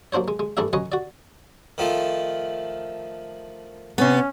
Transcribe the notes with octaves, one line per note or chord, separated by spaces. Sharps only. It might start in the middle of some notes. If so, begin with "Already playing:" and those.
F#3 A#3 D4 C5 C#5
G#3
G#3
G2 E3 A3 D4 G#4 E5
F#3 C#4 B4 C#5 D#5
F#4 D5
D#3 F3 A3
C3 B3 C#4